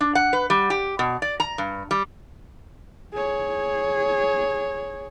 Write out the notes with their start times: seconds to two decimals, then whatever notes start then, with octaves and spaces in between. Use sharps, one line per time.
0.01 D4
0.15 F#5
0.33 B4
0.50 G3
0.70 G4
0.99 B2
1.22 D5
1.40 A#5
1.58 G2
1.91 G3
3.14 G#4 C#5